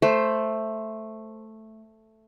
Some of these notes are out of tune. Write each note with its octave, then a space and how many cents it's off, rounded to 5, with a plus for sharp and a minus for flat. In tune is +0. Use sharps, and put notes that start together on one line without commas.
A3 +0 C5 +5